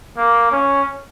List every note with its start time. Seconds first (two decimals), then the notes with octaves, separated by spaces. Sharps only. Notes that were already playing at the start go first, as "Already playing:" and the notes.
0.17 A#3
0.52 C#4